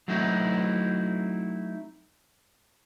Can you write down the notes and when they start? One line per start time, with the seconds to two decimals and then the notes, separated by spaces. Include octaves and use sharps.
0.08 F#3 A3 C4 D#4 E4 F#4